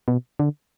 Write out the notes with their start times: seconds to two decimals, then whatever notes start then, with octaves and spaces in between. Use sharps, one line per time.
0.08 B2
0.39 D3